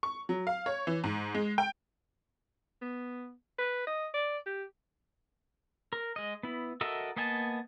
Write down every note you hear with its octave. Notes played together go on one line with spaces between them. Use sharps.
C#6
F#3
F5
C#5
E3
G#2
G#3
G5
B3
B4
D#5
D5
G4
A#4
G#3 D#5
B3 E4
F#4 A4 A#4 D#5 E5
A#3 B3 D#5 G#5 A5